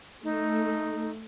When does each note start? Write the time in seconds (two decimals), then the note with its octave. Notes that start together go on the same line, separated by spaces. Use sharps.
0.24 A3 D#4